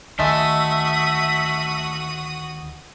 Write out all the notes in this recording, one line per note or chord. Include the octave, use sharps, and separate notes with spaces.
D2 D#3 G#3 A3 F#4 E5 D#6